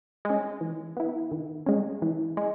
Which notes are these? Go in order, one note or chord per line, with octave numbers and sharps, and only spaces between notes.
G#3
C#4
E3
B3 E4
D#3
G#3 C#4
E3
G#3